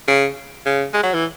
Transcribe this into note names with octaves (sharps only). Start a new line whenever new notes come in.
C#3
C#3
G#3
F#3
E3